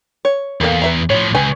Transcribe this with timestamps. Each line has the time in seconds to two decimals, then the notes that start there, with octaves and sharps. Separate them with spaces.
0.25 C#5
0.61 E2 A#3 A4 F5
0.82 B4 E5 A#5
1.10 A2 F3 C#5
1.35 C#2 B4 G#5